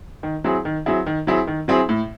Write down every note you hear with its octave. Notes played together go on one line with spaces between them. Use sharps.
D#3
F#3 C4 E4 G#4
D#3
F#3 C4 E4 G#4
D#3
F#3 C4 E4 G#4
D#3
F#3 C4 E4 G#4
A2